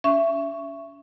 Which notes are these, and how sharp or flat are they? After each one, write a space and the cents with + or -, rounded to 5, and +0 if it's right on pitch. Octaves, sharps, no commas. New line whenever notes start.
C#4 +40 E5 +20 C#6 +0